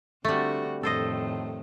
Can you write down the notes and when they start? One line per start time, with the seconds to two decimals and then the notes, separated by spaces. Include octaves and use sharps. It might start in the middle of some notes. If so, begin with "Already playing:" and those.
0.25 D3 G3 A3 C4 F#4
0.83 F2 A2 D#3 A4 C5 D#5